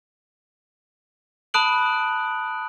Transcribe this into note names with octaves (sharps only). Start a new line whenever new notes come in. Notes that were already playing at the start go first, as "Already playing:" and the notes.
A5 B5 D#6 F#6 D7 F#7